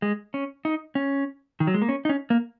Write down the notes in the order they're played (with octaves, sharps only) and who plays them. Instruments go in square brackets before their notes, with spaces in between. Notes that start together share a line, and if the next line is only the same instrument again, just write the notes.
[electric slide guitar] G#3
C#4
D#4
C#4
D#3
F#3
G#3
A#3
C#4
D#4
C#4
A#3